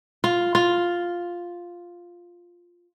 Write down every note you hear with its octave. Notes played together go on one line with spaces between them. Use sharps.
F4
F4